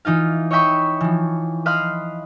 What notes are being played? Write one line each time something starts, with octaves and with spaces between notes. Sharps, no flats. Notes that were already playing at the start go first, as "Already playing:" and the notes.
E3 D#4 F4 F5
C#5 D#5 E5 G5 B5 C#6
E3 F3
D#5 F5 B5 C6 F6 F#6